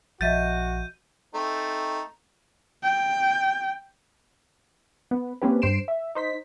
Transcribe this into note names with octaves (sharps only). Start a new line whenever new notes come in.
A#1 F3 F#4 D#5 E5 G6 A6 D#7
A3 C4 D#4
G5
B3
A#3 C4 C#4 G4 B4
G2 C5 C7 D7 E7
E5
D#4 C5 B6